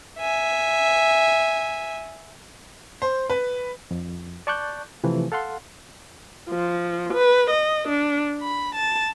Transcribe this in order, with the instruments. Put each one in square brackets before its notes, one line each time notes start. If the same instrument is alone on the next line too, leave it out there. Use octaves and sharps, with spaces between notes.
[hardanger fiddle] E5 G#5
[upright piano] C5
B4
[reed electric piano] F2
D5 A5 C#6 D6 F#6 G6
C3 E3 F3 A3
A4 F5 F#5 C6
[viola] F3
B4
D#5
D4
B5
A5